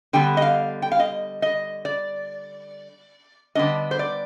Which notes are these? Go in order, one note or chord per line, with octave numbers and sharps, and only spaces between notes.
D3 G3 B3 G5
D#5
F5
G5
F5
D#5
D#5
D5
D3 G3 B3 D4 D#5
C5
D5